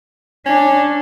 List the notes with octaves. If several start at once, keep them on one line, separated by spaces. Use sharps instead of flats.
C#4 D4